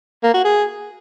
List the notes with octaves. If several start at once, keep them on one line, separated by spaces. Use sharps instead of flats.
A#3
F#4
G#4